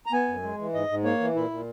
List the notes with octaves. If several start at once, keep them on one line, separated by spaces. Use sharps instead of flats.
A#5
B3 G#5
F#2
G#3
E3
G#2 D#5
G#2
A#3 C#5
E3
A#2 E4
A#2